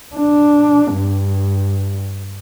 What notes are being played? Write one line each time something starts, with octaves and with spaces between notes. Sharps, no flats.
D4
G2